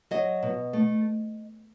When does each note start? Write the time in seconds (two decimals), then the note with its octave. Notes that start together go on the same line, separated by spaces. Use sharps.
0.11 F#3 D#5
0.43 B2
0.73 A3